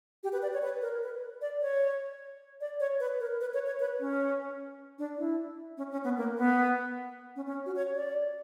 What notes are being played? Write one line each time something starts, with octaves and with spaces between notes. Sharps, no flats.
G4
B4
D5
C#5
B4
A#4
B4
D5
C#5
D5
C#5
B4
A#4
B4
C#5
C#5
B4
C#4
D4
E4
C#4
C#4
B3
A#3
B3
C#4
C#4
F#4
C#5
D5